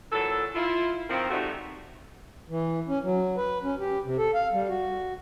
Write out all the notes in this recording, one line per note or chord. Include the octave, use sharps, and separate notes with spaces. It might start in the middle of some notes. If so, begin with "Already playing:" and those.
A#2 E3 F#3 A4
E4 F4
D#3 F3 C4
G#2 C3 G3 A3 D#4 F#4
E3
C#4
F#3
B4
C#4
G4
C3
A4
F5
G3
F#4